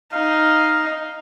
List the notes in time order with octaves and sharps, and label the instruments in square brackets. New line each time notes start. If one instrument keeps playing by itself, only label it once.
[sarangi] D#4 [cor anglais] F5